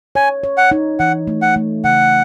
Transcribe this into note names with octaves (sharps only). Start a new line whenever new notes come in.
C#5 G#5
C#5
F#5
D#4
E3 F#5
A3
F#5
A3
C#3 F#5